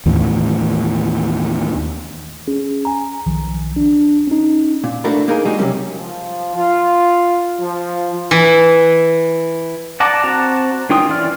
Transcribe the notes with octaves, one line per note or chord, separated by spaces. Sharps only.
D#2 A2 E3
C#4 G#4
G#5 A#5
B1 D#3 F3
D4
C#4 D#4
A#2
A3 A#3 D4 E4 F#4 A#4
A#3 D#4 G#4 A#4
G3 G#3 A#3 D#4 F#4 G#4
C3 F#3 G3 C#4
F3
F4
F3
E3
D5 F#5 A5 A#5 D6
C4 F#4 F#5 A5 A#5
D#3 C#4 F4 G5 D#6
E3 C#4 F4 D5 F6